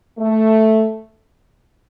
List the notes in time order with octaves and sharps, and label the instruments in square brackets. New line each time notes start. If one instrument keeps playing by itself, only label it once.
[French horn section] A3